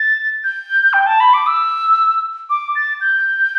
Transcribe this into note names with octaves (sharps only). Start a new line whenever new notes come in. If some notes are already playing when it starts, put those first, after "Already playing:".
Already playing: A6
G6
G5
A5
B5
D6
E6
D6
A6
G6